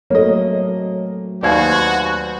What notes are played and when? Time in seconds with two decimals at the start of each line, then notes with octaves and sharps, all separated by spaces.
0.10 F#3 A3 A#3 C4 A4 C#5 D#5
1.43 D#2 F#4 B4 C5 D5 F5 G#5 G#6